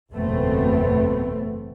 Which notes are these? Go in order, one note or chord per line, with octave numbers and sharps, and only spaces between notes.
F#1 E2 B2 A3 B3 C4